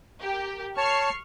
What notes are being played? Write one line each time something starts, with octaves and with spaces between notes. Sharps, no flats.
G4 A#4
C#5 A5 C#6 F6 C7